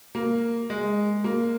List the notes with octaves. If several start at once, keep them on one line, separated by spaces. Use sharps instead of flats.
A#3
G#3
A#3